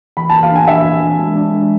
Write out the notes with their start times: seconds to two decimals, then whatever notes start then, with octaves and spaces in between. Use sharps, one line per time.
0.17 E3 B5
0.30 E3 A5
0.43 F5
0.52 D4 G#5
0.68 D4 E5
0.85 E3
1.01 E3
1.19 G#3
1.36 D4
1.53 G#3